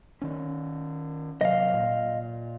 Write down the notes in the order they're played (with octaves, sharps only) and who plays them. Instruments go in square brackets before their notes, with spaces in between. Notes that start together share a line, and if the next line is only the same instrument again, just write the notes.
[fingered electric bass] D#3 C#4
[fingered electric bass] C3 F#3 [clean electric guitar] D#5 F5
[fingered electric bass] A#2